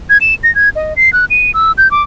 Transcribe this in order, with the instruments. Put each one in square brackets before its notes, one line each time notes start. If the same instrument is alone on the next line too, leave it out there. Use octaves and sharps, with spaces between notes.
[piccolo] G#6
E7
A#6
G#6
D#5
C7
F#6
D#7
E6
G6
D6